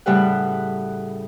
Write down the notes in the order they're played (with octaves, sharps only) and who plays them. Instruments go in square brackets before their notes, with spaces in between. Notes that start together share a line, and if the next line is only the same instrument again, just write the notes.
[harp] A2 C#3 G3 B4 F#5